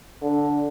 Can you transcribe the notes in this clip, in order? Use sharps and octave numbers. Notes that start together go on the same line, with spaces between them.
D3